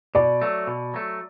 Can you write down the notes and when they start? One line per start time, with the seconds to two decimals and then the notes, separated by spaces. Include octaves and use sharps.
0.15 B2 D5
0.41 F#3 A3
0.67 B2
0.94 F#3 A3